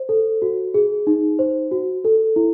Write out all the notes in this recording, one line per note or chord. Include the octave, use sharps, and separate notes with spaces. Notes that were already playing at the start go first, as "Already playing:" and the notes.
Already playing: C5
A4
F#4
G#4
D#4
C5
F#4
A4
E4